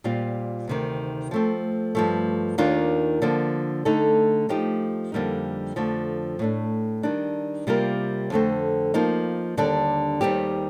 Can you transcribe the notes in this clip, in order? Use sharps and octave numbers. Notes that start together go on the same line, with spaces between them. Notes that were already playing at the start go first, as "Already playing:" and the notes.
A#2 G3 C4 F4
D2 C3 D#3
F3 A3 C4
G2 F3 A3
D#2 D#3 A#3 D4 F4
D3 F3 A#3
D3 A3 D#4 A4
F3 A3 D#4 G4
F2 D3 G3 A#3 D#4
F2 D3 F3 A3
A2 A3 D4
D#3 G3 D4
C3 G3 A#3 F4 A#4
F2 D3 A3 C4
F3 A#3 D#4
D#2 D3 G3 D4
D#2 D#3 G3 C4 G4